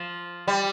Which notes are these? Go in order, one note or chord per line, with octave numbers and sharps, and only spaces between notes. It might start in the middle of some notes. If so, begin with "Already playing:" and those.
Already playing: F3
G3